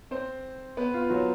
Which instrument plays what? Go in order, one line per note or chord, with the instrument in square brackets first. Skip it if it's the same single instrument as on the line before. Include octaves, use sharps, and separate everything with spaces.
[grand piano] C4 C5
B3 B4
F4
F#3 F#4